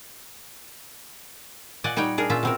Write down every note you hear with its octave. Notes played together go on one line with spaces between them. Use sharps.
A#2 D5 D#5 F#5 G#5
G3 D#4 C#5 F#5 G5
D4 G#4 A#4
A#2 C#4 F4 E5
B2 C4 A#4